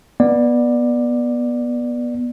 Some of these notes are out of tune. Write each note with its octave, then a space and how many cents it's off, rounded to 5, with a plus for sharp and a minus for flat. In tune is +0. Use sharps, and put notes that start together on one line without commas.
B3 -20 D5 +15